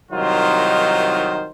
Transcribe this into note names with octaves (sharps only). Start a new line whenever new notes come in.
C2 D#3 F#3 D#4 F4 C5